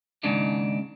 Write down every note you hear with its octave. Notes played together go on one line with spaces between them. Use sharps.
D#2 G#2 C#3 D4 D#4